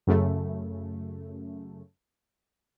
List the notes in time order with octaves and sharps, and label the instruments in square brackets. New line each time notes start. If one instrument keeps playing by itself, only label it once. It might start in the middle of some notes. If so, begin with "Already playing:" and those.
[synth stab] F#2 C#3 A3